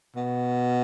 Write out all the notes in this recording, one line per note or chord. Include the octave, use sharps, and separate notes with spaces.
B2